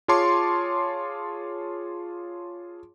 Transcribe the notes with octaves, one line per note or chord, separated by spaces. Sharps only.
F4 G#4 C#5 A5 C6 D6